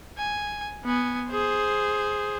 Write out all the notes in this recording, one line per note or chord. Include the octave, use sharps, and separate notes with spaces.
G#5
B3 G#5
G#4 C5